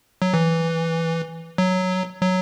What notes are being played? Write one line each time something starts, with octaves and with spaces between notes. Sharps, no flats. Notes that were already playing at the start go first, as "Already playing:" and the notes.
F#3
E3
F#3
F#3